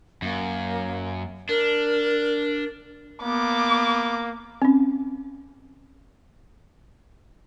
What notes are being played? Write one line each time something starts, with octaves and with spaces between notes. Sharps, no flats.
F#2 A#3
D4 A#4
A#3 B3 D6
C4 C#4